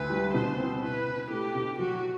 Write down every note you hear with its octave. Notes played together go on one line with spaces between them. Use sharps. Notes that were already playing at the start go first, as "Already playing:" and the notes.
Already playing: D2 B4
G3
B2 C5
C4
E4 B4
B2
A3 G4
B2
F#3 F#4